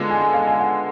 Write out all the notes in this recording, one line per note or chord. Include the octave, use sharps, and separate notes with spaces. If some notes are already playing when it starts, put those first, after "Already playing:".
Already playing: D3 G#3 B3 F4
G#5
G#5
F5
G#5
F#5